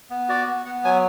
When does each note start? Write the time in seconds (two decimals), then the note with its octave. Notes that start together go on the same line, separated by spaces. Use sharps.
0.10 B3
0.29 F#4 D5
0.47 B3
0.65 B3 F#5
0.84 F#3 G#5